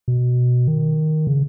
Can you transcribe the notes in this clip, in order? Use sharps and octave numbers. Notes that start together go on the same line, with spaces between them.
B2
D#3
C#3